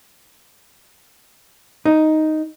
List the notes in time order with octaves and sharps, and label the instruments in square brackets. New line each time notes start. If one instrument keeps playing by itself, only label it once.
[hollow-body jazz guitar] D#4